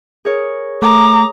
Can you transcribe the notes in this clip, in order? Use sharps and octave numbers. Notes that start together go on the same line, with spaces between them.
G#4 A#4 C#5
A3 A#5 D6 D#6